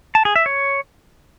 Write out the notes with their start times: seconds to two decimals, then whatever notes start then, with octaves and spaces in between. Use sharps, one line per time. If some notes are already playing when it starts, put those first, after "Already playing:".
0.15 A5
0.25 G#4
0.36 E5
0.46 C#5